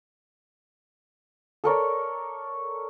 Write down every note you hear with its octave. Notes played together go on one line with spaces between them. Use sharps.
A4 A#4 C#5 D5